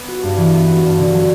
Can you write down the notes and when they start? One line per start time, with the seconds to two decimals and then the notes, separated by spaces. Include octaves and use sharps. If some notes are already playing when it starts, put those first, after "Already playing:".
Already playing: B3
0.08 F#4
0.23 G2
0.37 E3
0.53 B3
0.68 F#4
0.83 G2
0.98 D3
1.13 F#3